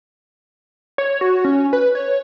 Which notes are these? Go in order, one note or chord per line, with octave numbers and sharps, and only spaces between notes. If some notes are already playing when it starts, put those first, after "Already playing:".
C#5
F#4
C#4
B4
C#5